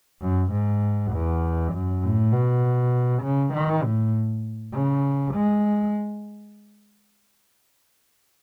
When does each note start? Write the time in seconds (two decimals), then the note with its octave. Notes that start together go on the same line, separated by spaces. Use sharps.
0.22 F#2
0.52 G#2
1.13 E2
1.73 F#2
2.03 A2
2.32 B2
3.23 C#3
3.54 D#3
3.84 A2
4.74 C#3
5.34 G#3